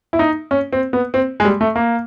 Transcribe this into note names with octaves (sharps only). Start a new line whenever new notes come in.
E4
D#4
C#4
C4
B3
C4
G#3
G3
A3
A#3